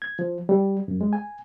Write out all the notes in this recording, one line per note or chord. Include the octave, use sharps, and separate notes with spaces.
G#6
F3
G3
F#2
G#3
G#5